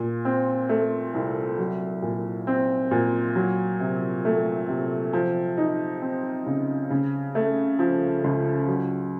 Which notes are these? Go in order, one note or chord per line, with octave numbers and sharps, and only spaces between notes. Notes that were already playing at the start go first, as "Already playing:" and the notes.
Already playing: A#2
C4
A3
C2
F#3
A#2
C4
A#2
F#3
C3
A3
C3
F3
D#4
C4
C#3
C#3
A3
F3
C#2
F#3